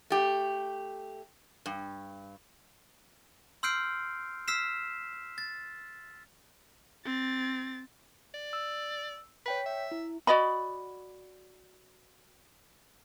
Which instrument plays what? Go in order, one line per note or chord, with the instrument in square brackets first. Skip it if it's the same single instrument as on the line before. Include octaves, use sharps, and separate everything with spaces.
[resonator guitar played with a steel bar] A3 G4
G2
[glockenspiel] C6 E6 F6 G6 C7 D7
E6 F6 B6 C7 E7
A6
[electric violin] C4 A6
[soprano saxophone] D5
[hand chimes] E6
[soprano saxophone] B4 [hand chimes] C#5 G5 B6
[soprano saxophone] E5
[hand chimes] E4
[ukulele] F#4 D5 D#5 B5